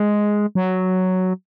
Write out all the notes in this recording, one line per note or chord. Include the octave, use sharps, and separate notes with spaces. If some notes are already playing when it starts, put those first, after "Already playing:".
Already playing: G#3
F#3